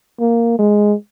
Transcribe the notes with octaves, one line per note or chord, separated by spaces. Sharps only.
A#3
G#3